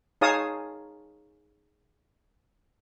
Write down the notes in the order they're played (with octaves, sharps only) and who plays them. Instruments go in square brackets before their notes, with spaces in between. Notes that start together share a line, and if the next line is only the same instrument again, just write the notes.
[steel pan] D#4 G#4 C#5 F5 A5 D#6